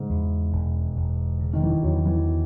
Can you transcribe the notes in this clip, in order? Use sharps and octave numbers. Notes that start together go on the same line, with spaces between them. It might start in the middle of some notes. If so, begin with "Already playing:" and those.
Already playing: G#2 C#3
E2
E1
E1
C#3
D#3
E3
E2 F#3
E3